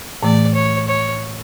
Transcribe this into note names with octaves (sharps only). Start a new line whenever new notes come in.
A2 E3 A3 D5
C#5
C#5